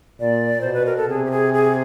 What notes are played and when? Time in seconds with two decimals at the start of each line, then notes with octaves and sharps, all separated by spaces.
0.20 A#2 D5
0.61 B2 C5
0.74 B4
0.86 A#4
0.97 A4
1.09 C3 G#4
1.25 G4
1.31 G#4
1.54 G#4